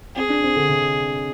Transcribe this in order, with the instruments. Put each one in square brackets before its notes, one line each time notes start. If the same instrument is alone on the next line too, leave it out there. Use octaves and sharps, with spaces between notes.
[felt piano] C4 [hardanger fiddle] G#4
[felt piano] D4
C4
D3
C3